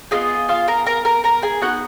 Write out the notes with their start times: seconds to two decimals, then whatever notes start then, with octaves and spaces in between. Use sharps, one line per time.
0.11 B3 D#4 F4 G#4 D#5
0.49 F4 F5
0.68 A#4 A#5
0.86 A#4 A#5
1.05 A#4 A#5
1.24 A#4 A#5
1.42 G#4 G#5
1.61 B3 D#4 F#4 F#5